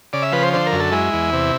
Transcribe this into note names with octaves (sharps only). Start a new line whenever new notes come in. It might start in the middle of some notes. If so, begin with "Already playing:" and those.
C#3 D5
E5
F3 B4
C5
D3 C5
A#4
F#2
A4
G#3 E4
E2
C3